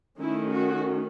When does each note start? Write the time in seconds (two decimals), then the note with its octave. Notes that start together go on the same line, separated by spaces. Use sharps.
0.19 D#3 A3 C#4 E4
0.51 F#4